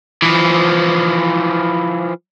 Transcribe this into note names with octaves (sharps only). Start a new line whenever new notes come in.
E3 F3